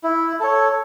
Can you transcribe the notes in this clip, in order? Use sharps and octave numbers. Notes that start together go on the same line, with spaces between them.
E4
A4 C#5